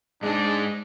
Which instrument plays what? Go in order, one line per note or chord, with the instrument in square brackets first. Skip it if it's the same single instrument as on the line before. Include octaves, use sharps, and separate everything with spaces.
[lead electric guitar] G#2 D#4 [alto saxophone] G#3 [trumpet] D4